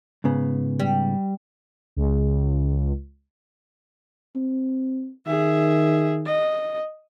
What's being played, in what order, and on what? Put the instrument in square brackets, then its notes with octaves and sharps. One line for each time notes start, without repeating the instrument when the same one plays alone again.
[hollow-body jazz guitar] G#2 C#3 B3
[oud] G3
[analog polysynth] C#2
[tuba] C4
[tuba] D#3 [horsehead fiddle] G#4 E5
[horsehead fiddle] D#5